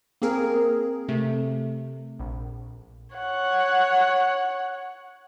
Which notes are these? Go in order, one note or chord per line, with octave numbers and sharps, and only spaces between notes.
A#3 C4 G#4 A#4
C3 A3
A#1
C#5 F#5